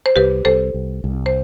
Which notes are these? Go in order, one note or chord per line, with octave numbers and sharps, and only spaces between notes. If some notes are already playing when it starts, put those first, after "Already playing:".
C5
C2 G4 B4
C2 A4 C5
C2
C2
C5